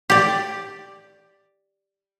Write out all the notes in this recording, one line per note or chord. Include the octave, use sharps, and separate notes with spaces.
G4 D5